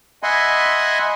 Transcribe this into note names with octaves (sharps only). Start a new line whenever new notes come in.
D#5 E5 F#5 G#5 B5 C6